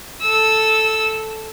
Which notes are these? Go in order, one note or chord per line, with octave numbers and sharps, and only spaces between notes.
A4 E6